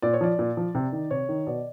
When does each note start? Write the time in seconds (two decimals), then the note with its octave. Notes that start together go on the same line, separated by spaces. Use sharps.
0.02 A#2 D5
0.14 C#5
0.21 F3 D5
0.39 A#2
0.57 F3
0.75 C3
0.92 D#3
1.11 C3 C#5
1.29 D#3
1.47 B2 D5